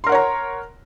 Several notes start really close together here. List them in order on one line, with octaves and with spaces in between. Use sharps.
C6 A#4 F#5 C#5 A#5